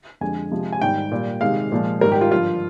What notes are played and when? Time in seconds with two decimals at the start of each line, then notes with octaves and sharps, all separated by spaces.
0.21 F2 D3 G#3 G#5
0.51 C3 F3 G#3
0.72 G#5
0.81 G#2 D#3 G3 G5
1.11 A#2 G3
1.41 C3 D#3 G#3 F5
1.72 A#2 F3 G#3
2.01 G#2 D#3 G3 A#4
2.12 G4
2.21 F4
2.31 G2 D3 F3 F4